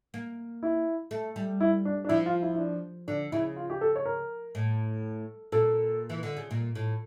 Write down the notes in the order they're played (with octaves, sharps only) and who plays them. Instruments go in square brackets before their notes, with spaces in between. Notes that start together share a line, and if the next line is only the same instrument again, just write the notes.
[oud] A#3
[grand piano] E4
[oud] A3
G3
[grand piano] E4
D4
D4
[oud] F3 [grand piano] E4
[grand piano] F4
E4
E4
D4
[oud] D3 [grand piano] D4
[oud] C#3 [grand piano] E4
[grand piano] F4
G4
A4
C#5
A#4
[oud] A2
[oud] A#2 [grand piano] A4
[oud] E3
D3
C#3
A#2
A2